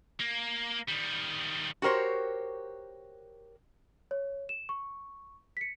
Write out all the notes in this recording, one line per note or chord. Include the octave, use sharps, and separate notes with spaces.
A#3
D#3 G3
F#4 G4 A#4 C5 C#5
C#5
E7
C#6
B6 C#7